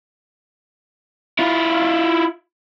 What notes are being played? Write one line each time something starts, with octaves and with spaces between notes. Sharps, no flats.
E4 F4